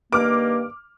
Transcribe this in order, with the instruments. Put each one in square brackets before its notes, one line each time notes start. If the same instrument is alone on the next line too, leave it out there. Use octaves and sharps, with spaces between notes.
[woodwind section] G2 D#3 A#3 [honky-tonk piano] D6 F6